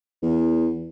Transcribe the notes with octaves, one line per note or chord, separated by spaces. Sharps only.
E2